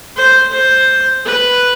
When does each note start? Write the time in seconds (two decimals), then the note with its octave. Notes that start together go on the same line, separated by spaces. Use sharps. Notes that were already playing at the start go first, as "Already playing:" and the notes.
0.16 C5
0.52 C5
1.25 B4